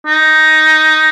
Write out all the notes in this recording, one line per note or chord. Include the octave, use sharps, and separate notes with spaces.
D#4